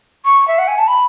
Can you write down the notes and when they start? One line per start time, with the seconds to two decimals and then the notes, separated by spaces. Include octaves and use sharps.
0.25 C#6
0.48 E5
0.59 F#5
0.68 G#5
0.78 A5
0.88 B5